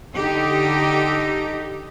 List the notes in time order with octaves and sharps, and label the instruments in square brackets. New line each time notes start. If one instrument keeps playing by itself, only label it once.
[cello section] D3 D#4 G4 A4